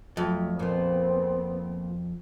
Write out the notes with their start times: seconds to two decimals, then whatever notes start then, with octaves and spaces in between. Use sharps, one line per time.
0.17 F2 F#3 A3
0.59 A#2 F3 B3 C4